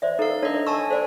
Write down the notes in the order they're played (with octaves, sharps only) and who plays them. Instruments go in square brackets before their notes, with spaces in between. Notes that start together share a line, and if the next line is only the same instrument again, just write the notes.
[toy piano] C5 D5 E5
[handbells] D#4 F5 [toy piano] A4 A#4
[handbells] D4 D#5 [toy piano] A#4 C#5
[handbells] G#5 A5 E6 [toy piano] C#6
[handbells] A4 [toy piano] C5 D5 G#5